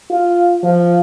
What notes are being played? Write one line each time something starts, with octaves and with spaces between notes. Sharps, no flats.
F4
F3